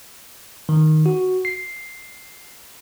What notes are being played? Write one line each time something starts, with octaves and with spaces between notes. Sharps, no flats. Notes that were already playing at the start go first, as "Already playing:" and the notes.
D#3
F#4
C7